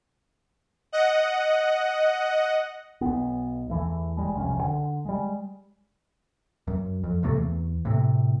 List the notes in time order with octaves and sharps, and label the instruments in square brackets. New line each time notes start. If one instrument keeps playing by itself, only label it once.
[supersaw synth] D#5 F#5
[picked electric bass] B1 B3
E2 E3 A3
F#1 G3 G#3
E1 C2 F2 C#4
D3
G3 G#3
F#2
F2
C#2 A2 C3 A3
E2
A2 C3